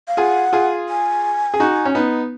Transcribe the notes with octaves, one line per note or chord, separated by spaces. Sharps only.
F5
F4 G#4 F#5
F4 G#4
G#5
G#4
D#4 F#4
C#4
B3 D#4